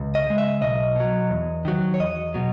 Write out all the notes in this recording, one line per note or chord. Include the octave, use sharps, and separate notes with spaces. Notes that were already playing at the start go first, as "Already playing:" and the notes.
Already playing: C#2
D#5
C#3 G#3
E5
B1 D#5
B2 F#3
E2
D#3 F#3
C#5
E2 D#5
B2 F#3